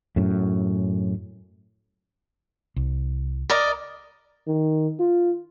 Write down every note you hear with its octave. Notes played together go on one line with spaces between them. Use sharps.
F#2 A2
C2
A#4 D5 D#5
D#3
F4